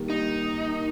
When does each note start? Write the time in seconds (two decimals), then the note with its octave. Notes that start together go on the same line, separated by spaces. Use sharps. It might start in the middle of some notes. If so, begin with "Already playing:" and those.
Already playing: D#3 G3 A#3
0.10 D#4